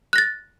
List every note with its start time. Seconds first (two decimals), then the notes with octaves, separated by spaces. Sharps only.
0.13 F#6
0.16 A#6
0.18 A6